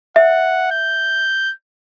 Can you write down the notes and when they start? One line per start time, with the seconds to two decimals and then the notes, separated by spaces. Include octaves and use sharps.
0.16 E5 F#5
0.71 G6